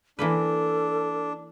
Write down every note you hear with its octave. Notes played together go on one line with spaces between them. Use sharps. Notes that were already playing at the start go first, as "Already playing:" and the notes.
E3 A#3 D4 A4 B4